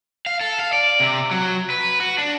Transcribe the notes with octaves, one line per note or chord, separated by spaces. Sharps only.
F5
A4
F5
D5
C3
F#3
B4
F#4
D4